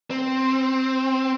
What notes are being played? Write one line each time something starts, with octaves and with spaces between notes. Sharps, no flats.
C4